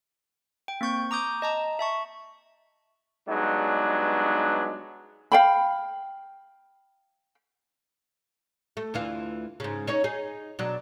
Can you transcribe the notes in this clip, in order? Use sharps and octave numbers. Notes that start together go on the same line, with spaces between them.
G5
A#3 C4 C#6 G6
A#5 D6 D#6 G6
D#5 A5 A#5
E5 A5 C#6
G2 F#3 G#3 B3 D4 D#4
F5 G5 B5
A3
D2 E3 F4
G#2 C#3
C#4 D#4 C#5
D#4 G#4
B2 F#3 D4